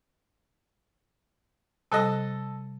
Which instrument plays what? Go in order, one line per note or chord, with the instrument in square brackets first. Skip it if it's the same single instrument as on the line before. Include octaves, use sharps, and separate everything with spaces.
[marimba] C3 G3 F#6 [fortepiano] A4 D#5